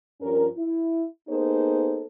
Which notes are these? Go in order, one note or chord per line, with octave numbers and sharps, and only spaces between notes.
G2 F3 C#4 A#4
E4
A#3 B3 D#4 G#4 A4 C5